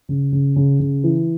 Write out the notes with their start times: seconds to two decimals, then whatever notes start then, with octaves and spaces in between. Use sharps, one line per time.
0.09 C#3
0.33 C#3
0.56 C#3
0.80 C#3
1.04 E3